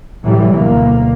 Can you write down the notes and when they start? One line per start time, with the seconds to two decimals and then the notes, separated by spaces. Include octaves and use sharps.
0.24 A2 C3 E3 F#3 G3
0.56 D2 B2 A#3